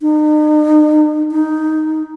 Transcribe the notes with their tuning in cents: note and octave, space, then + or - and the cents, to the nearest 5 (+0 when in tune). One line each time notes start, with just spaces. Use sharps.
D#4 -40
D#4 +0